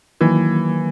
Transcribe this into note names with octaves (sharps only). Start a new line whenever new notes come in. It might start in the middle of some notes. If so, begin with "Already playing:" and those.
D#3 E3 F#3 A#3